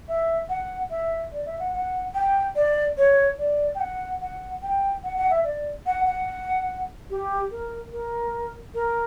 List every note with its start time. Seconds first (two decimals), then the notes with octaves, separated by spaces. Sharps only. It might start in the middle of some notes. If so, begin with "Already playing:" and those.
0.08 E5
0.49 F#5
0.90 E5
1.32 D5
1.46 E5
1.59 F#5
1.74 F#5
2.15 G5
2.56 D5
2.98 C#5
3.39 D5
3.75 G5
3.80 F#5
4.21 F#5
4.63 G5
5.04 F#5
5.17 F#5
5.31 E5
5.44 D5
5.86 F#5
6.06 F#5
7.10 G4
7.51 A#4
7.92 A#4
8.74 A#4